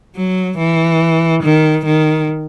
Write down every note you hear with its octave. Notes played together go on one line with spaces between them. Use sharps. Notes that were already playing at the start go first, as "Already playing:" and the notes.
F#3
E3
D#3
D#3